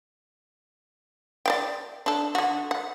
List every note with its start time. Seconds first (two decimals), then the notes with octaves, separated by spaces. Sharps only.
1.46 D5 F5 G5
2.06 D4 A4
2.35 D3 F#4
2.71 F#5